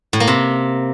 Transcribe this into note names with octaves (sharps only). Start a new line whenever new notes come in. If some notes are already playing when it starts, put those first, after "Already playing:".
A2
A#3
C3